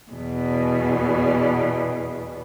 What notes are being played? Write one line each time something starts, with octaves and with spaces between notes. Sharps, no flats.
E2 B2